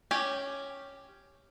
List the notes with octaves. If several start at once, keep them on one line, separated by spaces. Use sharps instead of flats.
C#4 G4 G#5